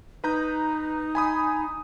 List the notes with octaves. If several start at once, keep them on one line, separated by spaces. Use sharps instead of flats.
D#4 B4 A#5 G6
G#5 B5 D#6